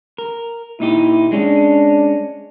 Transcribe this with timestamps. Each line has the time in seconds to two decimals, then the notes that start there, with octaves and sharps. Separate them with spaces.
0.18 A#4
0.80 A#2 D#4 E4 G4
1.32 G#3 C#4 D4